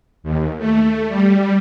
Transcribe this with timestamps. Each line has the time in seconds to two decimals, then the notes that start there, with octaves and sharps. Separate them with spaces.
0.23 D#2
0.59 A3
1.08 G3